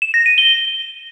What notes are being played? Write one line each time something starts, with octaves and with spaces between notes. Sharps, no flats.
E7
A#6
D#7
G7